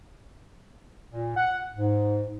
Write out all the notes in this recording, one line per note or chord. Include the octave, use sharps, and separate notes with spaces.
A#2
F#5
G#2